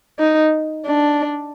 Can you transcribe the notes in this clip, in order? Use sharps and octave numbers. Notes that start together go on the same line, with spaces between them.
D#4
D4